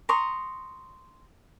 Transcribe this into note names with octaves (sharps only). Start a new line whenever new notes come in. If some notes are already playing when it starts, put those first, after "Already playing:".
A#5 C6 C#6 D#6